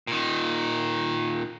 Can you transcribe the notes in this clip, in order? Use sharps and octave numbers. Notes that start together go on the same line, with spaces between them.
A#2 D#3